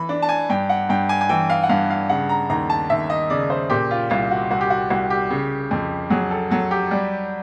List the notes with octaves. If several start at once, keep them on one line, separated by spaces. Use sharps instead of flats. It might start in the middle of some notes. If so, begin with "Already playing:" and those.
Already playing: E3 B5
D4
A5
G#5
G2 G5
F#5
G2 G5
G#5
G#5
E3 G5
F5
F#5
G2 F5
F5
C#3 F#5
A#5
D#2 A#5
A5
D#2 E5
D#5
C#3 D5
C5
A#2 G4
F4
C2 F4
F#4
C2 F#4
G4
F#4
C2 F#4
G4
C#3
F2
F#3 G#4
A4
F#3 A4
G4
G3